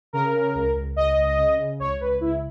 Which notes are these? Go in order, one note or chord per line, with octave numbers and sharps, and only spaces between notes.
C#3 A#4
C#3
C#2
C#2
C#2 D#5
C#2
C#3
C#3
C#2 C#5
C#2 B4
C#2 E4